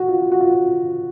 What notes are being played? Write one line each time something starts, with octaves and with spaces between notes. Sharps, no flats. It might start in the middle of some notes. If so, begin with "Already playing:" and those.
Already playing: F#4
F4
F4
F#4
F4